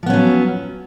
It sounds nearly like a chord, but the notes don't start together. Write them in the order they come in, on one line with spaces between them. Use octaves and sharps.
F3 B3 C#4 F#3